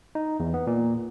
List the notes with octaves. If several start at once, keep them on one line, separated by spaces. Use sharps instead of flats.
D#4
E2
B3
A#2